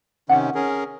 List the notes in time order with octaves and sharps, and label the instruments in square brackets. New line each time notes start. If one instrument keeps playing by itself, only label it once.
[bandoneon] C3 D#3 C#4 [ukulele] F#5
[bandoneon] C#4 G#4 A#4